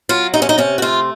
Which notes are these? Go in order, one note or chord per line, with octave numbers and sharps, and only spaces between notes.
F#3 F4
C3 D#4
C#4
D#4
C3 C#4
F#4
A3 F4